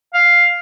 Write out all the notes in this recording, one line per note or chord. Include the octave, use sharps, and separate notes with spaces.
F5